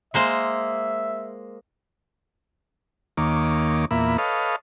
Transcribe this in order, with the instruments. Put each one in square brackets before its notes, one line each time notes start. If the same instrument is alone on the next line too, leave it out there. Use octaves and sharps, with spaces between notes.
[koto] G#3 A#3 C5 [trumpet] E5
[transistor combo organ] D#2 D#3 A#3 C#5 D6
E2 A#2 A#3 E5 B5
A4 B4 C#5 D#5 F5